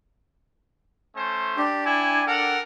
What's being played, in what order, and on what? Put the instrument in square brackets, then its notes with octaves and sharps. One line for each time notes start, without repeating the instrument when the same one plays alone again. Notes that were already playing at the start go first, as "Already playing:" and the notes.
[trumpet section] A3 C#4 C5
[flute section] D4 G5 [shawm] G4
[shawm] E4 [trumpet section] G#5
[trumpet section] A4 F#5 [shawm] A#4